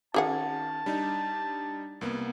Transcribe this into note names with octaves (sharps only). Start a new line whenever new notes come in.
D#3 C#4 F#4 G#4 F#5 A5
G3 D4 D#4
C2 A#3 B3